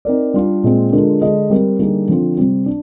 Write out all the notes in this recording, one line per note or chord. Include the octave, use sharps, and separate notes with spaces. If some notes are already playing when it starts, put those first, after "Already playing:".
C4 D#4 A#4 D5
G3 D4 F4
A#2 G#3 C4
D3 G#3 D4 F4 A#4
D3 G#3 D4 G#4 D#5
G3 C4 G4 A#4
D3 G3 A#3 D#4 G#4
D3 F3 C4 F4
C3 G3 C4
D4